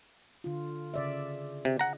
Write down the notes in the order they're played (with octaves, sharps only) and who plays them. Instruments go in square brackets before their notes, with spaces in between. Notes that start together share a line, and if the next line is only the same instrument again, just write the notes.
[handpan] D3 F4
C#3 D5 E5
[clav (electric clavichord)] C3
F#5 A#5